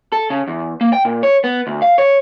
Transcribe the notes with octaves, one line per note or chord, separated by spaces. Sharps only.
A4
C#3
E2
A#3
G5
A#2
C#5
B3
D2
F5
C#5